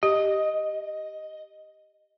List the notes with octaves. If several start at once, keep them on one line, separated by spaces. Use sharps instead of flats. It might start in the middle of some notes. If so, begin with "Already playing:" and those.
G4 D#5